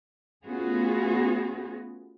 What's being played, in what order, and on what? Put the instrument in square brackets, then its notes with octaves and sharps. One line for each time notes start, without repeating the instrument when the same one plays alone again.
[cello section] A3 B3 C#4 F4 F#4 G#4